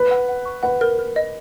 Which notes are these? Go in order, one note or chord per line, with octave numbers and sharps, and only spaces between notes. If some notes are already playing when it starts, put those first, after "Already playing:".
Already playing: B4
F#5
F#5
C#6
B4 F#5
A#4
A#4
D#5